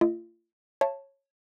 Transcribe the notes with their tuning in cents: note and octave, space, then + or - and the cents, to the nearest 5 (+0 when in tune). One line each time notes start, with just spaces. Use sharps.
A3 +35 F4 -35 D#5 +0
C#5 -15 E5 +40 A5 +0